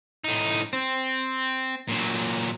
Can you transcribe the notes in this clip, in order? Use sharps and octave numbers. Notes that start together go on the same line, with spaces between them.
A2 D#4
C4
A#2 F#3